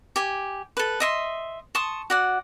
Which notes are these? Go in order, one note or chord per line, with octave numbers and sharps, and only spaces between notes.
G4 G#5
A4 B4
D#5 E5 C6
A5 C6 C#6 D#6
F#4 D5 F#5